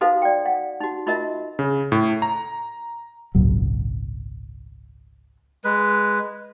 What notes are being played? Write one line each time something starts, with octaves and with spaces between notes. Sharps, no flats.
D#4 F#4 A4 B4 C5 F5
D5 G5
F#5
D#4 F#4
D#4 F4 F#4 A#4 D#5 E5
C#3
A2
A#5
G#1 C#2 A#2 F#3
G#3 B4